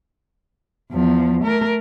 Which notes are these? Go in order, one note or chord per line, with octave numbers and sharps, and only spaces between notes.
E2 F3
A3 A#4